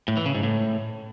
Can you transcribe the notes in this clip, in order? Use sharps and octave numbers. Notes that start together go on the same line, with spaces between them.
A2
E3
C#3
G#2
A2